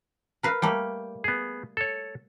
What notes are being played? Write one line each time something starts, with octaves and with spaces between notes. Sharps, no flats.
A#4 B4 F5
G3 A3 A#3 G5
B3 G#4
A4 C#5